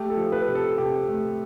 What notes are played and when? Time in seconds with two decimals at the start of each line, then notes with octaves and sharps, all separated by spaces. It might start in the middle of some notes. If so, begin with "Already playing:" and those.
Already playing: A3 G4
0.10 A4
0.17 F3
0.32 B4
0.48 C3
0.55 A4
0.78 C3 G4
1.09 A3